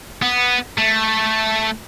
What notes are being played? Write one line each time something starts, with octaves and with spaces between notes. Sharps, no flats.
B3
A3